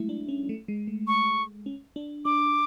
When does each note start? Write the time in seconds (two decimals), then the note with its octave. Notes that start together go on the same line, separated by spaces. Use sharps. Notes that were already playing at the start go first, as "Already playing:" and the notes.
Already playing: F#3 G#3 A3 E4
0.09 D4
0.29 C#4
0.49 A3
0.68 G#3
0.87 A3
1.07 C#6
1.66 C#4
1.96 D4
2.25 D4 D6